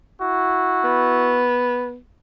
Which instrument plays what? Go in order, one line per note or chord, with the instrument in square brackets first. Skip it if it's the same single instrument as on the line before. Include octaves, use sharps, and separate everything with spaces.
[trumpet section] E4 F#4
[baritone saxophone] B3